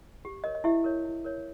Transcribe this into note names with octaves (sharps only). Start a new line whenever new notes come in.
G4
A#4 C#5 D#5
D#5
E4 G4 E5
A#4 C#5
E4
A#4 C#5